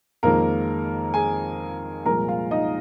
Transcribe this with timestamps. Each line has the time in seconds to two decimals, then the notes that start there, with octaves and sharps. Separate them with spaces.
0.23 F2 D#3 G#3 A#3 A#4
1.14 G#4 G#5
2.05 C2 A#2 F3 G#3 A#4 A#5
2.28 F4 F5
2.51 D#4 D#5